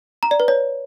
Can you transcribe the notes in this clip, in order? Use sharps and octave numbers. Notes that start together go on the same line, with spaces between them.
A#5
D5
B4
C#5